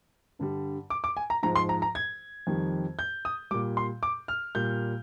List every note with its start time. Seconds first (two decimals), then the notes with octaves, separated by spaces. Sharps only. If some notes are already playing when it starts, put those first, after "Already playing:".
0.39 G2 D3 G3
0.90 D6
1.04 D6
1.17 G#5
1.30 A#5
1.43 G#2 F3 A#5
1.56 C6
1.69 A#5
1.82 A#5
1.95 G#6
2.47 F2 D#3 G3
2.99 G6
3.25 D#6
3.51 G3 D6
3.54 A#2
3.77 C6
4.03 D6
4.28 F6
4.55 A#2 G3 G6